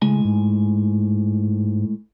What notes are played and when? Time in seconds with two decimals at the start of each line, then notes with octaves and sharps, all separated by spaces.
0.02 A2 C#3 G#3 G#5
0.25 G#2